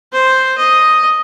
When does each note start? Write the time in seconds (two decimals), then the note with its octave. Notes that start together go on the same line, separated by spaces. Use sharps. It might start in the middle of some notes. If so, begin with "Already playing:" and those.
0.13 C5
0.58 D#5